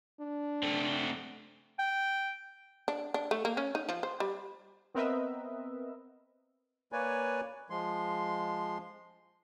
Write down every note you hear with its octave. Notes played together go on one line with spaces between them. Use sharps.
D4
A3 C4
G5
D4
D4
A3
A#3
C#4
D#4
F3
C5
G3
B3 C4 A#4 B4 D#5 E5
A#3 B4 C#5 D5 G#5
F3 G#3 C6